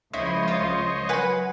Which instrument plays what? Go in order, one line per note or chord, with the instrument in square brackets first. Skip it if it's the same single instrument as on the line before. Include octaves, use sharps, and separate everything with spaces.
[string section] C#2 F3 [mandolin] E4 [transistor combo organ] C5 C#5 D#5
[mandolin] F4
[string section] F#3 [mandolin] B4 F#5 G#5